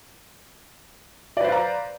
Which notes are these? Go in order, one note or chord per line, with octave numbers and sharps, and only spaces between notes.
B4 C5 D5 F5 A#5